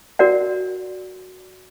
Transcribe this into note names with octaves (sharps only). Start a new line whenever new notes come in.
F#4 A#4 D5 F#5